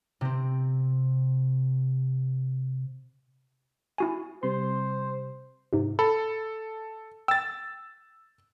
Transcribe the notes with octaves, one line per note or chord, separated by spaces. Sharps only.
C3 C4
E4 F#4 G#5
C3 G3 C5 C6
G#2 C3
A4 B5
G5 E6 A6